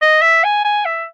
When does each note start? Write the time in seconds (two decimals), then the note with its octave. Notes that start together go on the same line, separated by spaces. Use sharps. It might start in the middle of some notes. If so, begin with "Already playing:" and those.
0.02 D#5
0.22 E5
0.44 G#5
0.65 G#5
0.85 E5